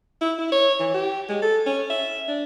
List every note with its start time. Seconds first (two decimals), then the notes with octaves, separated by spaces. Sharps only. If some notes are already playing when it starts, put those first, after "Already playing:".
0.21 E4
0.38 E4
0.52 C#5
0.80 E3
0.94 G4
1.29 G#3
1.42 A4
1.66 C#4
1.90 E5
2.28 D4